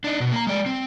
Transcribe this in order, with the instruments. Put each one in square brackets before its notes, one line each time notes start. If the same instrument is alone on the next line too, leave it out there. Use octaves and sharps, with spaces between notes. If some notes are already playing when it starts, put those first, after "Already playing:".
[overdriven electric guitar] D4 D#4
B2
A#3 A#5
G#3 D5
C4